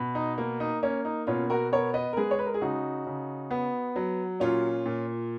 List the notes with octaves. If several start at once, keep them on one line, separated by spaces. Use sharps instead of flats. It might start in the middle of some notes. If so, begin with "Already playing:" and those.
Already playing: B2
D#4
A#3
D#4
A#3 C#4
D#4
B2 C#4 F4
F#4 A#4
B3 A#4 C#5
B4 D#5
A#4
G#3 G#4 B4
C#5
B4
A#4
G#4
C#3 D#4 F#4
C#3
B3
F#3
A#2 C#4 F4
A#2